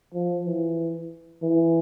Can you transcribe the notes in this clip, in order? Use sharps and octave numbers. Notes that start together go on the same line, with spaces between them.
F3
E3
E3